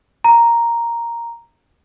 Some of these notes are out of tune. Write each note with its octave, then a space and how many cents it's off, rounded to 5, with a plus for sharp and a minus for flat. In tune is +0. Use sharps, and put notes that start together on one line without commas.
A#5 +0